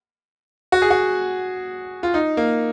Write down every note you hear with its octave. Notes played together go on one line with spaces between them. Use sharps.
F#4
G#4
F#4
F4
D#4
A#3